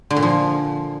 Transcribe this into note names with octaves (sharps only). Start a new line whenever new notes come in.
D3
A#2
F3